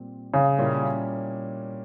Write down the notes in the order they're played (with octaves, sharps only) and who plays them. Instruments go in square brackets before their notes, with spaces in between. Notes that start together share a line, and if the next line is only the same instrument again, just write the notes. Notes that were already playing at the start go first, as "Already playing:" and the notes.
Already playing: [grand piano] A#2 G3 C4
[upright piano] C#3
[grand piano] A#2 G3 A#3 C#4 E4